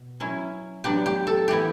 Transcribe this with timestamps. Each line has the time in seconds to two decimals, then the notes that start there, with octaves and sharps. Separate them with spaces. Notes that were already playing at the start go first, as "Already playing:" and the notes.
Already playing: B2
0.20 F#3 C#4 E4
0.84 F#3 B3 D4 G4
1.06 G4
1.27 A4
1.48 E3 B3 E4 G4